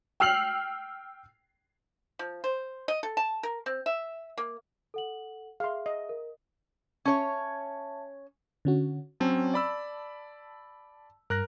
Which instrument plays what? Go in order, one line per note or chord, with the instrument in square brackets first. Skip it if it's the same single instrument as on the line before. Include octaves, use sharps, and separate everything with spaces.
[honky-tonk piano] G5 E6 F6 C7 F7 F#7
[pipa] F3
C5
D#5
A4
A5
A#4
C4
E5
A#3
[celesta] A4 F#5 F#7
[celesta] G#4 E5 [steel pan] F5 C6
[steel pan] D#5
[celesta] A#4
[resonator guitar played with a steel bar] C#4 C#5 [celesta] E5 A5
[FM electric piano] D3 C#4 F#4
[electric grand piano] F#3 C4 C#4 [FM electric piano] A5
[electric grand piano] D5 B5 E6
[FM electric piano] G2 [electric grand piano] A#4 F#6 A#6